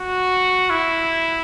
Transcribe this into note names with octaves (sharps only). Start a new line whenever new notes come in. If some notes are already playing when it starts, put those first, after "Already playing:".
Already playing: F#4
E4